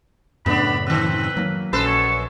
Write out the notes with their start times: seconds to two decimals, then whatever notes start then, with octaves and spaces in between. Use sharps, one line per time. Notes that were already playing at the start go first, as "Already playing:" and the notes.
0.46 F#2 A2 C#3 B3 D4 B5
0.86 D#3 C4 B4
1.37 F#3 A#3
1.73 A#1 F#2 A4 B4 C5
1.86 C#5